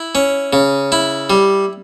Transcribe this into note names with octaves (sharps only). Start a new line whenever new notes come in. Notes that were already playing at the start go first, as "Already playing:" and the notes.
Already playing: E4
C#4
C#3
E4
G3